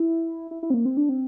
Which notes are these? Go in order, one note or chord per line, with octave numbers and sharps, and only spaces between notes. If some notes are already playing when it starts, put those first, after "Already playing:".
Already playing: E4
E4
E4
C4
A#3
C4
D4
C4